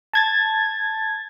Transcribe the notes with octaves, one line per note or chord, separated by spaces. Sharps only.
A5 G#6 A6